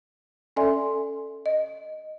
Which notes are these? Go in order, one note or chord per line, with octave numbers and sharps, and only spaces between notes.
C#4 A4 D5 E5 G#5 C6
D#5